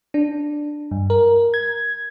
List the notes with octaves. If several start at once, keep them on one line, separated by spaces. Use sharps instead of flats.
D4
G2
A#4
G#6